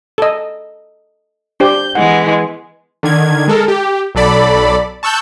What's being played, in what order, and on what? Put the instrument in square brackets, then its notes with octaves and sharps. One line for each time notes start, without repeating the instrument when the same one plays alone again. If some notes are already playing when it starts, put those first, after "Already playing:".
[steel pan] A4 D#5
[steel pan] D4 G4 C5 [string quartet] G6
[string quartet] E3 G#3 B3 [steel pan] F#5
[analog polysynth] D3 D#3 G#6
G#3 A4 A#4
G4
B1 F#3 A4 D5 B5
A5 C#6 E6 F#6 G6